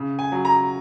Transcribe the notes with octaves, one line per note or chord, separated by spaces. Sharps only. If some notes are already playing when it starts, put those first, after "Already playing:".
Already playing: C#3
G#5
F#3
A#5